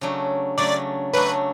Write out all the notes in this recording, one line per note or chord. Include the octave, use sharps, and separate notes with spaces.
C#3 F#3 A3 D4
C#3 F#3 A3 D4 D5
C#3 F#3 A3 D4 B4